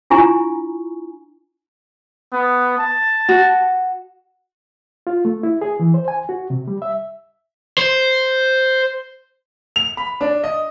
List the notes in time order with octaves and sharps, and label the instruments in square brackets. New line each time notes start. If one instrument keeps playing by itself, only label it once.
[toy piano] D4 E4 F4 G#5 A#5 C#6
[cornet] B3
A5
[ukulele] F#4
[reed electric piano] F4
A3
E4
G#4
E3
C5
G#5
F#4
C3
G3
E5
[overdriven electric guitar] C5
[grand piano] F7
B5
D4
D#5